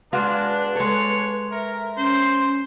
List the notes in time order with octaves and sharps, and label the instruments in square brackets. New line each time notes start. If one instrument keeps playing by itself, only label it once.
[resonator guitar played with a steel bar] G#3 F#4 F5 [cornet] D4 [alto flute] B4
[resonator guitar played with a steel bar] G#3 A4 [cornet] C#5
[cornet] A#4 [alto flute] E5
[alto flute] C#4 [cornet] C5